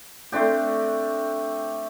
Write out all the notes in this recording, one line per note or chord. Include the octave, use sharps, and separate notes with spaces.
A3 C4 D4 G4